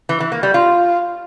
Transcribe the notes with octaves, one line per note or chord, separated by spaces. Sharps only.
E3
E3
A#3
G3
F4